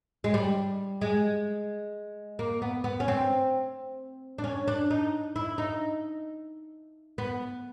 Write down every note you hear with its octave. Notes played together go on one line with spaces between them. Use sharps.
G#3
G3
G#3
A#3
B3
B3
C#4
C4
D4
C#4
D4
D#4
E4
D#4
B3